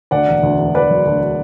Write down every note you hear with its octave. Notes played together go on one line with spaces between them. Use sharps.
D2 D5 F#5
E1
D2
E1
E1 B4 D5
F#3
D2